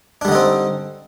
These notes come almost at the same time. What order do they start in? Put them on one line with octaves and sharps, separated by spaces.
D4 G3 D3 D#4 C4